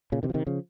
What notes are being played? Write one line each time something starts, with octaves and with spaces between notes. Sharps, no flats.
A#2 C#3
C3 D#3
F3
C3 D#3
C#3 F3